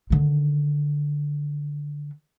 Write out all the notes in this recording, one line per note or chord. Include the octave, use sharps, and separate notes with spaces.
D3 D#3